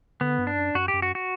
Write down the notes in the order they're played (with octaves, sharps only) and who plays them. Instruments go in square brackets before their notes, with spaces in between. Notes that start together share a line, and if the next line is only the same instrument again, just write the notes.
[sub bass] D3 [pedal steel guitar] B3
[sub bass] G2
[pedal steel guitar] D4
[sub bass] F#2
[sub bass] F#2 [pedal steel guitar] F#4
[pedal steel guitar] G4
[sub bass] F#2
[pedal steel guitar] F#4
F#4